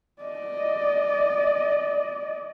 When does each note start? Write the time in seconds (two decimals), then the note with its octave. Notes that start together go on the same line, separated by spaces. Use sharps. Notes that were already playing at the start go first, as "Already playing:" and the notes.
0.22 D5 D#5